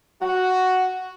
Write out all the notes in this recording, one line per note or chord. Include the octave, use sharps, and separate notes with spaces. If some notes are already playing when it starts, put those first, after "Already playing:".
F#4